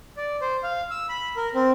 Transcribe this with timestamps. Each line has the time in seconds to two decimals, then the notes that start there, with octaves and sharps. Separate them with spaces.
0.17 D5
0.41 C5
0.63 F5
0.91 E6
1.09 B5
1.36 A#4
1.55 C4